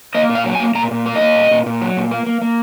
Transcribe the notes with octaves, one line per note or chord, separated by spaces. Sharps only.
A#3 D#5
A#2
F5
F#3
G#5
A#3
A#2 A#5
A#2
A#3
D#5
A#3
A#2
A#2
A#2
F#3
A#2
A#3
A#3
A#3